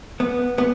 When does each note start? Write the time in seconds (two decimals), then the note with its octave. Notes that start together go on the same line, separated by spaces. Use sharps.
0.20 B3
0.58 B3